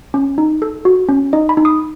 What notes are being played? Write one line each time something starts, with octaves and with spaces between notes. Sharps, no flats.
C#4
D#4
A4
F#4
C#4
D#4 D#5
B5
D#4
D#6